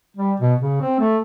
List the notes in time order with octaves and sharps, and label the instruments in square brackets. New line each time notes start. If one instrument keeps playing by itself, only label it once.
[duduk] G3
B2
C#3
C4
A3